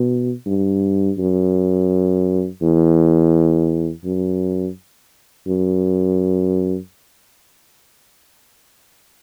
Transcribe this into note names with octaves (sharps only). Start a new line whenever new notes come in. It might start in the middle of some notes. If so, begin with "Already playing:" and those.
Already playing: B2
G2
F#2
E2
F#2
F#2